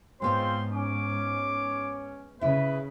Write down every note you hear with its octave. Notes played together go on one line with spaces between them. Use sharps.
G#2 G#3 B3 C4 F4 C5 C#5 C6
C#4 D6
C#3 E4 B4 E5